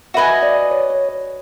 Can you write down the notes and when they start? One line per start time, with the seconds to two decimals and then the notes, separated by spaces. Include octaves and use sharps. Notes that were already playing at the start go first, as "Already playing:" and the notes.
0.14 F#4 B4 D#5 E5 G#5
0.43 D5
0.71 C#5
0.90 C#5
1.09 C#5